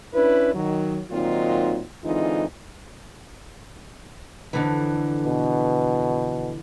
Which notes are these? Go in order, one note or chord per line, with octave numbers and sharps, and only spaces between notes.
C#4 D4 E4 B4
D#3 F#3
A#2 D#3 F#3 C4 D#4 F4
D3 E3 G#3 C4 D#4 F4
F2 D3 E3
B2